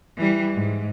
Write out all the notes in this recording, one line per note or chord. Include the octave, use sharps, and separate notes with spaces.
E3 G3
G#2